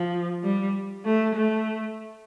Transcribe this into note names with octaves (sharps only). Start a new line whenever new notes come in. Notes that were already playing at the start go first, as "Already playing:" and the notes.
Already playing: F3
G3
A3
A3